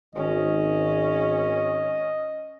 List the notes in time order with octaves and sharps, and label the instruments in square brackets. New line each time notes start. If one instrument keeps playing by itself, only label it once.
[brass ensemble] G#1 [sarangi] C#4 [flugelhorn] D#5